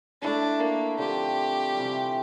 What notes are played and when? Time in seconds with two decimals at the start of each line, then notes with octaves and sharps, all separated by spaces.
0.22 A3 D4 E4 A4
0.60 A#3
0.99 D3 F3 C4 G4
1.75 C3 E3 G3